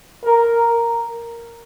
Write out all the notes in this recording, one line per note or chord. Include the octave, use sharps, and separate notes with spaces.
A#4